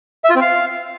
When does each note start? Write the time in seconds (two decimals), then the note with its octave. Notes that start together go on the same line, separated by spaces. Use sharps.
0.24 E5
0.30 F4
0.35 C4
0.41 F5